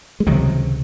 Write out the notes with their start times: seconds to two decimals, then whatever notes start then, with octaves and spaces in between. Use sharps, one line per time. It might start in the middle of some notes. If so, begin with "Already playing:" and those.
0.20 G#3
0.27 C#2 C3 D#3 F#3